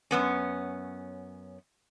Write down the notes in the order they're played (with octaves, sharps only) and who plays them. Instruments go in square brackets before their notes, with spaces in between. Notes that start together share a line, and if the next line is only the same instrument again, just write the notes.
[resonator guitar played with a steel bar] F#2 B3 C#4